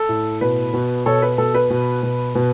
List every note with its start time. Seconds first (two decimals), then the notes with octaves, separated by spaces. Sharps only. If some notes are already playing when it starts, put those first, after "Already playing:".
Already playing: A4
0.09 A2
0.41 B2 B4
0.74 B2
1.06 B2 A4 C#5
1.22 B4
1.38 B2 A4
1.54 B4
1.70 B2
2.03 B2
2.35 B2